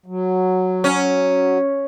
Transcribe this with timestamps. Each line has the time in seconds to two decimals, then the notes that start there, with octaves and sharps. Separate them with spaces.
0.06 F#3
0.84 C#4